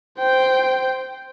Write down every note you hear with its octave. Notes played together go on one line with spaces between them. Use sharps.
C5 G5